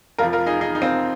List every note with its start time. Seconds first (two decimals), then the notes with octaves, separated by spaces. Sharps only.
0.18 F1 F2 F3 F4 A#4
0.33 F4 A#4
0.46 D#4 G#4
0.61 D#4 G#4
0.75 D#4
0.82 C4 F4